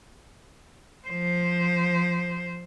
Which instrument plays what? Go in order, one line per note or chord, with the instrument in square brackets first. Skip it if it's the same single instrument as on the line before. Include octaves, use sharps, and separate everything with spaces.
[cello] F3 C5